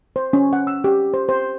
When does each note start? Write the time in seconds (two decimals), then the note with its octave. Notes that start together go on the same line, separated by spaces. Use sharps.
0.16 C5
0.33 C#4
0.53 F#5
0.67 E6
0.84 G4
1.14 C5
1.29 C5